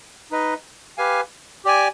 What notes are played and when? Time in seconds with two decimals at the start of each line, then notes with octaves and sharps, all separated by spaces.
0.31 D#4 B4 D#5
0.98 G4 B4 F5 G#5
1.65 G4 D5 G#5